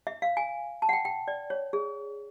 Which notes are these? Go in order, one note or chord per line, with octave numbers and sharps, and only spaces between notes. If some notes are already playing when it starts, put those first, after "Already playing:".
E5
F5
G#5
A5
F#5
G5
G5
D5
C#5
G#4